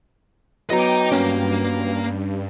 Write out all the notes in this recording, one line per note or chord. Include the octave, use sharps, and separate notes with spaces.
F#3 B3 D#5 G5 A#5 D6
G2 A#3 C#4